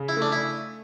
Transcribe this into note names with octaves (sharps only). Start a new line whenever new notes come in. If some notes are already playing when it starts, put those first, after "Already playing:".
Already playing: C#3
E4
A3 D4
E4